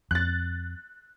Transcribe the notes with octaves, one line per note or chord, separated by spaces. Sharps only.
F2 F#6 A6